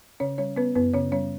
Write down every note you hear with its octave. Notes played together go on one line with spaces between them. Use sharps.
C#3 C#4 C#5
G3 C#4 C#5
B3 C#4 B4
F#2 B3 B4
C#3 C#4 C#5
G3 C#4 C#5